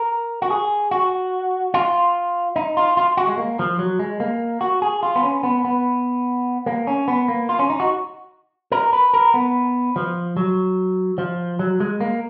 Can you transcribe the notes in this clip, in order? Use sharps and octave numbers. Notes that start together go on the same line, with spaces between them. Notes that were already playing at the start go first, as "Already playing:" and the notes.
Already playing: A#4
F#4
G#4
F#4
F4
D#4
F4
F4
F#4
G#3
A#3
F3
F#3
G#3
A#3
F#4
G#4
F4
B3
C#4
B3
B3
A#3
C#4
B3
A#3
F4
C#4
D#4
F#4
A#4
B4
A#4
B3
F3
F#3
F3
F#3
G#3
A#3